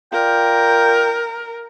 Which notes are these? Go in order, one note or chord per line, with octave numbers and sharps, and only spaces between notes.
F4 A#4 D5 G5